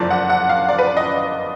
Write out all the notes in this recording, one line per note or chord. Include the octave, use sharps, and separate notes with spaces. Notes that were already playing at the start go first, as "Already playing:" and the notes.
Already playing: F#1 F2 F3 D5
F#5
F#5
F5
D5
B4
D5
D#5